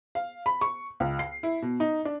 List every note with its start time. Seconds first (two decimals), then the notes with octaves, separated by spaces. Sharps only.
0.15 F5
0.46 B5
0.61 C#6
1.00 C#2
1.19 C7
1.43 E4
1.62 B2
1.80 D#4
2.05 D4